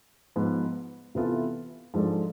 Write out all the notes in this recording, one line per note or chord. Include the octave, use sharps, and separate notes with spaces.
G#2 F3 B3
C3 E3 B3 F4 A4
G#2 F3 G#3 D4 A4